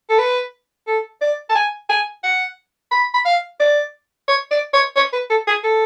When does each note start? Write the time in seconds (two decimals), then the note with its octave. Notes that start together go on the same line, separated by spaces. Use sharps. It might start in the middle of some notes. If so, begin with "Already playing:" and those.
0.10 A4
0.19 B4
0.87 A4
1.21 D5
1.49 A5
1.55 G#5
1.89 G#5
2.23 F#5
2.91 B5
3.14 B5
3.25 F5
3.60 D5
4.28 C#5
4.51 D5
4.74 C#5
4.96 C#5
5.13 B4
5.30 A4
5.48 G#4
5.64 A4